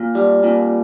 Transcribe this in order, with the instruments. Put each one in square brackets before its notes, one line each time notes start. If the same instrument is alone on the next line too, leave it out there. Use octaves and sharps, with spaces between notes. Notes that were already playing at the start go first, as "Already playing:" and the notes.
Already playing: [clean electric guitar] A#2
G3
A#2